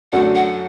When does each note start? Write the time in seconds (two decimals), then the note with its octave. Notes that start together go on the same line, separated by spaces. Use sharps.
0.12 F#2 D3 F#3 A3 D4 F#5
0.35 F#5